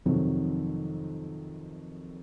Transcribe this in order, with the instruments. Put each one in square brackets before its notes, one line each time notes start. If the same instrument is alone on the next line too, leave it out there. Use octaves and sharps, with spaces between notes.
[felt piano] F2 C3 D#3 F#3